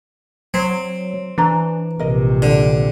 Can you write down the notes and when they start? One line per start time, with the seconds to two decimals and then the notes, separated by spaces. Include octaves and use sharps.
0.54 F#3 C4
1.38 E3 D4 A#5
1.99 A#1 C3 A#4 D#5
2.42 D3